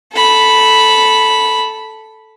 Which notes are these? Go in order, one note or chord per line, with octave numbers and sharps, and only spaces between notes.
A4 B5